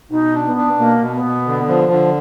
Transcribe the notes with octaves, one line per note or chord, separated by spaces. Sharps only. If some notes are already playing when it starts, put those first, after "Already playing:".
B2 D#4
D4
B3
D4
B2 A#3
B2
B3
B2
D3
F3
D3